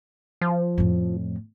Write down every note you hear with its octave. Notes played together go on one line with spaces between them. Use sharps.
F3
F2 A2